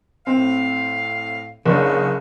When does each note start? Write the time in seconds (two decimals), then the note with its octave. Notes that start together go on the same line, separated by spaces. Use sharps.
0.27 A2 C4 F5
1.65 F#1 C#3 D4